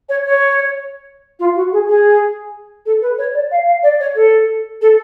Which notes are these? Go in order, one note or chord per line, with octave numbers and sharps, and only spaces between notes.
C#5
C#5
F4
F#4
G#4
G#4
A4
B4
C#5
D5
F5
F5
D5
C#5
A4
A4